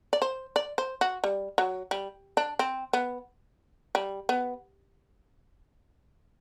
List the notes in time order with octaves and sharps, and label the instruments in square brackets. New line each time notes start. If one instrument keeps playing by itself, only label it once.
[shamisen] D5
C5
D5
C5
F#4
G3
F#3
G3
D4
C4
B3
G3
B3